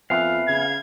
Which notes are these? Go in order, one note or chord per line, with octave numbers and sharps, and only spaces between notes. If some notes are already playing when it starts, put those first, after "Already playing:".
F2 B3 E5 F5 G#5
C#3 G#6